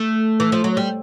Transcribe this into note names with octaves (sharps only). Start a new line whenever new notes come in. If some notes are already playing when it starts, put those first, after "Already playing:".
Already playing: A3
E3
F3
F#3
G3